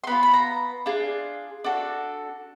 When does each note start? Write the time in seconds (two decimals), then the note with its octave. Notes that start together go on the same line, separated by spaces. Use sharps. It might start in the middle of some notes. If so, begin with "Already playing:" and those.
0.04 C6
0.07 B3 D4 F4 B5
0.23 B5
0.33 A#5
0.86 D4 F4 G#4
1.64 D4 F#4 A4